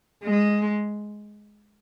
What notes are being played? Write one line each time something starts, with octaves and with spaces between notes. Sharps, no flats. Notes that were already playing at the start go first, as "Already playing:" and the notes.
G#3